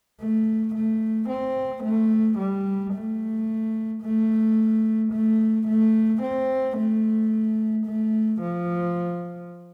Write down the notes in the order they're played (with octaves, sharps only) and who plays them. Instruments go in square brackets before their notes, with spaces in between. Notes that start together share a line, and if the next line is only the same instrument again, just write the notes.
[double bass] A3
A3
C4
A3
G3
A3
A3
A3
A3
C4
A3
A3
F3